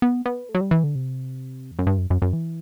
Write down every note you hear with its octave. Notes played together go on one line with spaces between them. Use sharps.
B3
B3
A3
F#3
G3
E3
D3
C3
E2
F#2
G2
F#2
F#2
F#2
E3